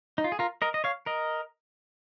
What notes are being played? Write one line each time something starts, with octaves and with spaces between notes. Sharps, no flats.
D#4
F4
G#4
F4 A#4
A#4 D#5
D#5
C#5 F5
A#4 D#5